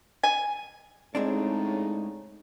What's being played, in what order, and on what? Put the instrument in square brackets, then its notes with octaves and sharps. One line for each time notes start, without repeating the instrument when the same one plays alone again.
[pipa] G#5
[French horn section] A2 C#3 D#4 [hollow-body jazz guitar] G#3 C4 D4